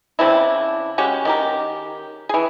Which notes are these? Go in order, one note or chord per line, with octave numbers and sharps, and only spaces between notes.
C#3 C4 D4 E4
G#3 C#4 F#4 G4
D#3 G4 A#4
E3 G#4